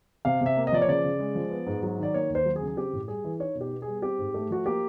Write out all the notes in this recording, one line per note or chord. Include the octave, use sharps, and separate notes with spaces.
C3 F5
C3 E5
A#3
D#5
F3 D5
C#5
C#3 D5
C#3
G#3
F3
B3
G#2
F#3
D#3 D5
A#3 C#5
D#2
C5
F#3
G#4
C#3
G#4
C4 G4
A2
G3 G#4
E3
D#4 C#5
B2
G4
B3
G#4
G3
C4 G4
G#2
A3
F3 F#4
A#3 G4